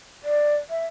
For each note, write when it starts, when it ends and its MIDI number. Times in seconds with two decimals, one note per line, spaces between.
0.24 0.55 74
0.70 0.86 76